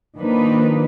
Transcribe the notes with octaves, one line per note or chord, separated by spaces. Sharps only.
D#3 F3 A#3 D4 D#4 B4